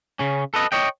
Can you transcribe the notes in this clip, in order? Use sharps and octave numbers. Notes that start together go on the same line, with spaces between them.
C#3 C#4
A4 B4 D#5
C#5 D#5 G5